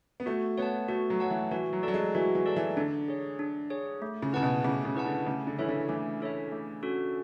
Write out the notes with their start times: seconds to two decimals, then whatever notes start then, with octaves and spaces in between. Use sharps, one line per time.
0.20 B3
0.26 A3 F#4
0.58 B3 C#5 F#5 A5
0.88 A3 F#4
1.10 F#3
1.20 C#5 F#5 A5
1.30 E3
1.51 E3 F#4
1.73 F#3
1.83 F#3 A4 D5 A5
1.94 G#3
2.15 E3 F#4
2.35 E3
2.46 A4 D5 A5
2.56 E3
2.77 D3 D4
3.08 G#4 C#5
3.39 D4
3.70 G#4 C#5
4.02 A3
4.22 C#3
4.33 C#3 E4 B4 F#5 A5
4.43 B2
4.64 C#3 A3
4.85 C#3
4.95 E4 B4 F#5 A5
5.06 D3
5.26 C#3 A3
5.47 D3
5.58 E3 E4 A4 C#5 E5
5.69 D3
5.89 E3 A3
6.21 E4 A4 C#5 E5
6.52 A3
6.83 C#4 F#4 A4